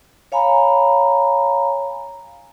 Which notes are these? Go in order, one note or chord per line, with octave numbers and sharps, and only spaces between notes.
C#5 F5 G#5 A#5 B5